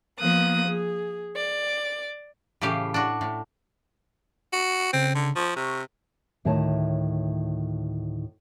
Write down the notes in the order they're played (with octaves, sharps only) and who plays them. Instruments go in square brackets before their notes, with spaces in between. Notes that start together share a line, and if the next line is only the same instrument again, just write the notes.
[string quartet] F3 A#3 B3 D#6 F#6
G#4
D5
[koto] A2 C#3 E3 G4 F5
D4 F#4
A2
[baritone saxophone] F#4
[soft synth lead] C#3 [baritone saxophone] C4
[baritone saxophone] D3
[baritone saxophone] F3 [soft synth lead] C#6
[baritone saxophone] C3
[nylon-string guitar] D2 A2 D#3 A#4 C#5 A5